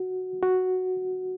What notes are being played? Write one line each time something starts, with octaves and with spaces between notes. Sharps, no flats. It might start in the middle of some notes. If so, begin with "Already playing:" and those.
Already playing: F#4
F#4